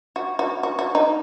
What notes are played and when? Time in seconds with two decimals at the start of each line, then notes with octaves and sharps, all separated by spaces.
0.16 F#4
0.39 F#4
0.63 F#4
0.79 F#4
0.95 D#4